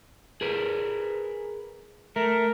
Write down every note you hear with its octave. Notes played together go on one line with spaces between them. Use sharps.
G#4 A#4 B4
A3 A#4